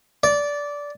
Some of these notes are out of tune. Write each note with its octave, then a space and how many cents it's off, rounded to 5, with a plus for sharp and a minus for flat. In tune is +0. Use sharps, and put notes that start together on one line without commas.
D5 -15